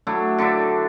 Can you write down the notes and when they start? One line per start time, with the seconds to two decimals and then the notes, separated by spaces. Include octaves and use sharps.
0.07 F#3 A3 D4 E4
0.38 D3 D4 D5 E5